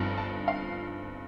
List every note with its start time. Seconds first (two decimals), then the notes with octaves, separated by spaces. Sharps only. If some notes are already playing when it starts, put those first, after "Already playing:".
Already playing: G1 G2 F3 C4 D#4
0.18 A5
0.48 F5